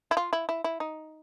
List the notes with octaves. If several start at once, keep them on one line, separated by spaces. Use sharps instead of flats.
E4
F4
E4
E4
E4
D#4